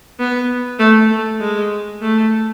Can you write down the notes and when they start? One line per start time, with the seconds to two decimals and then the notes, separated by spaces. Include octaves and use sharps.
0.19 B3
0.79 A3
1.10 A3
1.40 G#3
2.02 A3